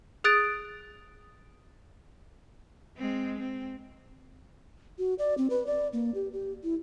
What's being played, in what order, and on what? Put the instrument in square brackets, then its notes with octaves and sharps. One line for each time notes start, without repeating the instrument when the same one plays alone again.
[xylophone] G#4 D#6 F#6 A6 D7
[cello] G#3 C4
C4
[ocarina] F#4
D5
C4
B4
D5
A#3
G4
G4
E4